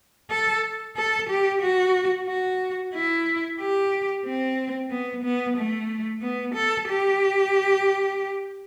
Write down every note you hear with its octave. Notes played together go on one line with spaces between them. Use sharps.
A4
A4
G4
F#4
F#4
E4
G4
C4
B3
B3
A3
B3
A4
G4